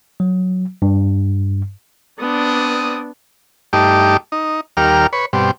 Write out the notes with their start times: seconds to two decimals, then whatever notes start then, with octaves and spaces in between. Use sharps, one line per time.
0.20 F#3
0.82 G2
2.19 B3 C4 D4 D5 D#6
3.73 G2 A3 D#4 G4 D6
4.32 D#4
4.77 D#2 G3 G4 A#4 F6
5.13 B4 C#5
5.33 G2 B2 G3 C4